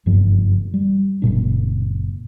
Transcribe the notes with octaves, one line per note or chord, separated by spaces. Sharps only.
F#1 G2 F3
G3
F#1 C2 A#2 D4